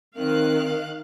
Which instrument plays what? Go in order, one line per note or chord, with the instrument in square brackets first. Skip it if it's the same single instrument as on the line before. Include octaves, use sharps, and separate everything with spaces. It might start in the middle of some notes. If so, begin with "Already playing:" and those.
[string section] D#3 F#6 [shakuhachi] C4 [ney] A#4 [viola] F5